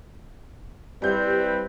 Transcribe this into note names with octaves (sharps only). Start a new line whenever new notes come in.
G3 C4 E4 B4 G6